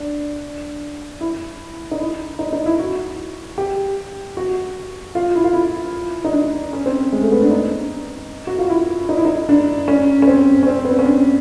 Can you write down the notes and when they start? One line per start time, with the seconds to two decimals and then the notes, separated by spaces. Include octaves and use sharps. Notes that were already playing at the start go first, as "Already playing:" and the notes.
Already playing: D4
1.21 E4
1.91 D#4
1.99 E4
2.39 D#4
2.53 D#4
2.66 E4
2.79 F#4
3.58 G4
4.37 F#4
5.15 F4
5.35 E4
5.44 F4
5.53 E4
6.24 D#4
6.33 D4
6.73 C#4
6.86 C4
7.12 G#3
7.22 A3
7.32 B3
7.42 D4
7.51 D#4
8.47 F#4
8.59 F4
8.70 E4
9.09 D#4
9.17 E4
9.25 D#4
9.49 D4
9.88 C#4
10.22 C#4
10.28 C4
10.63 C#4
10.67 C4
10.85 B3
10.91 C4
10.99 C#4
11.06 D4